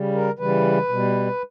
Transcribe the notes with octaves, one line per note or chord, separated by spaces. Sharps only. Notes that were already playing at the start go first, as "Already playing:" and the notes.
Already playing: C#3 G3
A#4
C#3 E3 G3 B4
B2 G3